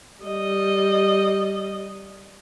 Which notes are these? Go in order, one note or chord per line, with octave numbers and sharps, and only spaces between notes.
G3 D#5